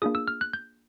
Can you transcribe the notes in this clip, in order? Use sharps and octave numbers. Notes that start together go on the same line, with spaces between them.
A#3 D4 F4 G#4 D#6
E6
F6
F#6
G6